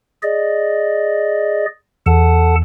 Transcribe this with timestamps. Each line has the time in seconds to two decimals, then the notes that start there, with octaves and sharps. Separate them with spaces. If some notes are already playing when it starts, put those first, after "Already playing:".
0.23 G#4 D5 D#5
2.06 E2 A4 F#5 A5